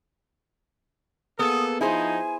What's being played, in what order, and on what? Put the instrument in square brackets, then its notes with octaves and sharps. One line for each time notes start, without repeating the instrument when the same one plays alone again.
[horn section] A#3 G#4 A4 [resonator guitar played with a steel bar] B3 [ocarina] D#6
[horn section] F3 D#4 [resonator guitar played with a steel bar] E4 G#4 C5 [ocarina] G#5